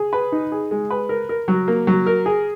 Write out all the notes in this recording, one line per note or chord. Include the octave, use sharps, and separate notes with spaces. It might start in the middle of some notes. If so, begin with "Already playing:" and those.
Already playing: G#4
B4
D#4
G#4
G#3
B4
A#4
A#4
F#3
A#3
F#3
A#4
G#4